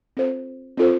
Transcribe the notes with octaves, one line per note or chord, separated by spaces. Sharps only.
C4 F4 A4 C5
C4 F4 A4 C5